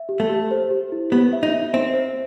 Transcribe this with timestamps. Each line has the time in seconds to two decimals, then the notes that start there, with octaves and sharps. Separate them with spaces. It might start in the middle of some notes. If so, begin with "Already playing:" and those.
Already playing: E5
0.09 G4
0.20 A3
0.29 G4
0.51 C5
0.70 G4
0.92 E4
1.12 B3 G4
1.33 E5
1.43 D#4
1.54 E5
1.73 C4 E5
1.94 C5